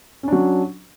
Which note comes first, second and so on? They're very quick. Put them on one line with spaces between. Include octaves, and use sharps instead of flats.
C#4 D4 F#3